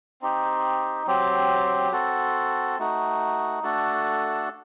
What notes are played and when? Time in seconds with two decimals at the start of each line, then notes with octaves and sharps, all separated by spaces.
0.22 C4 D#4 G4
1.07 F#3 C4 G4
1.92 C4 F#4 A4
2.79 A3 D#4 F#4
3.63 A3 D4 F#4 A4